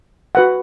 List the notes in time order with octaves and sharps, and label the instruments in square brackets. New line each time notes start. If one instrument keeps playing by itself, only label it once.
[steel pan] F#4 B4 F#5